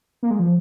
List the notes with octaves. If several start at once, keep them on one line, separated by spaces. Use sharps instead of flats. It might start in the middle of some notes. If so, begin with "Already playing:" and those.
A#3
G#3
F3